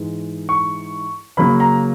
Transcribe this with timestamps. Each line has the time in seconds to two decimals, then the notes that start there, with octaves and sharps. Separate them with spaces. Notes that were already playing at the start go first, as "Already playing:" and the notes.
Already playing: G#2 E3 G#3
0.49 C#6
1.37 C#3 F#3 A#3 B5
1.60 A#5